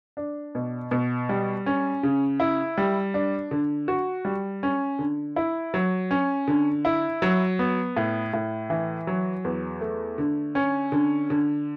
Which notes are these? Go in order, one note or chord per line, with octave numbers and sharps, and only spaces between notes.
D4
B2
B2
G3
C#4
C#3
E4
G3
D4
D3
F#4
G3
C#4
D3
E4
F#3
C#4
D3
E4
F#3
B3
A2
A2
E3
F#3
E2
A3
D3
C#4
D3
D3